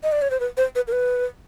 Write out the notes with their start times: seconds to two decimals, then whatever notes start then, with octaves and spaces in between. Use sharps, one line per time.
0.03 D#5
0.12 D5
0.22 C#5
0.31 C5
0.40 B4
0.57 C5
0.75 B4
0.87 A#4
0.92 B4